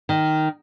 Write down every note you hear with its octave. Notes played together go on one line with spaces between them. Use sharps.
D#3